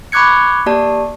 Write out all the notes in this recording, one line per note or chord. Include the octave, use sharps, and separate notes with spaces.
B5 C#6 D6 F#6 G#6 C#7
A#3 G4 D5 A5